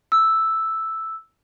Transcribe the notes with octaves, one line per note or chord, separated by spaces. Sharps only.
E6